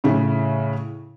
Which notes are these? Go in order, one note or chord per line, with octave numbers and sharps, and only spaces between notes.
A2 C#3 E4